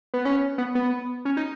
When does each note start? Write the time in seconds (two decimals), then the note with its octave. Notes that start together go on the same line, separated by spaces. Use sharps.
0.14 B3
0.25 C#4
0.58 B3
0.75 B3
1.25 C#4
1.37 D#4